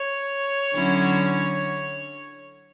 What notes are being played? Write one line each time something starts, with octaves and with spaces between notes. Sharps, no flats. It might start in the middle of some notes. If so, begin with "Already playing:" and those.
Already playing: C#5
D3 F#3 C#4 E4